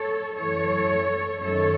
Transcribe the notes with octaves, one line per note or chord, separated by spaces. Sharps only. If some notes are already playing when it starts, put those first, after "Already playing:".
Already playing: A4 C#5
F#2 E3 A4 C#5
F#2 D#3 A4 C#5